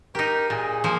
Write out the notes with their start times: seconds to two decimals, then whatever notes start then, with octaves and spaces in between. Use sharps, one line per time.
0.15 D#4 G4 A#4
0.49 A#2 G#4
0.84 F3 A#3